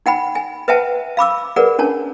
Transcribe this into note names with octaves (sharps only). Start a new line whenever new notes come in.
D#4 F#5 G5 B5
G#5
B4 C5 E5 F#5 G5 A5
F5 B5 D6 E6
G#4 A#4 B4 D5 F#5
C#4 D4 C#5 A5